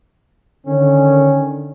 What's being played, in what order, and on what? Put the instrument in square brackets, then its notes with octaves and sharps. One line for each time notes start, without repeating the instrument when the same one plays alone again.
[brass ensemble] D3 D#3 C#4